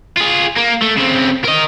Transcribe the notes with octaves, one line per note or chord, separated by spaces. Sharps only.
F4 G#4
A#3
A3
C#3 C4
A#4 D#5